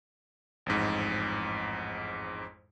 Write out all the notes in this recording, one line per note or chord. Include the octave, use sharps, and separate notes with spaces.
A1 F2 G#2